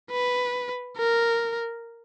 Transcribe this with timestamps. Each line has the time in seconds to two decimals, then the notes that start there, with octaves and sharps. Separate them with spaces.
0.11 B4
0.96 A#4